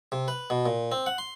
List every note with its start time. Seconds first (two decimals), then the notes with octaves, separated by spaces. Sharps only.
0.12 C3
0.28 B4
0.50 B2
0.66 A#2
0.92 C4
1.06 F#5
1.18 C6